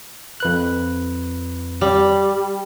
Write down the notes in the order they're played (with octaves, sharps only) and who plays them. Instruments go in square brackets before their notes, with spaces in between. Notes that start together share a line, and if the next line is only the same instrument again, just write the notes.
[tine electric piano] F2 B4 F#6
[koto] G3